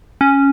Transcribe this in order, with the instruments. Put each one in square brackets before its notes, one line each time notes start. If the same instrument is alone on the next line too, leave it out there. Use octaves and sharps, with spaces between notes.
[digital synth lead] C#4